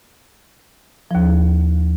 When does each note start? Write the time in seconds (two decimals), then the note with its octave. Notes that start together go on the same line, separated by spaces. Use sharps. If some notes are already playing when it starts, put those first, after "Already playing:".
1.11 D#2 F3